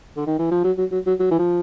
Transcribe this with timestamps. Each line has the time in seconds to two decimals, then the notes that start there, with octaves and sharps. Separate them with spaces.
0.17 D3
0.27 D#3
0.39 E3
0.51 F3
0.64 F#3
0.78 F#3
0.92 F#3
1.06 F#3
1.19 F#3
1.31 E3
1.39 F3